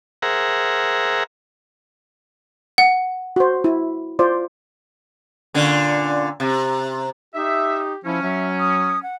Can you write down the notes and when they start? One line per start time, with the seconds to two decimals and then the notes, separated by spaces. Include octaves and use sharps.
0.22 G#4 A#4 C5 E5 F#5 A#5
2.78 F#5
3.36 F#4 C5
3.64 E4
4.19 F4 C5 D5
5.54 A#2 D3 C#4
6.40 C3
7.35 D#4 G4 E5
8.05 F3 C#4 E4
8.22 F#3 E5
8.60 D#6
9.03 F#5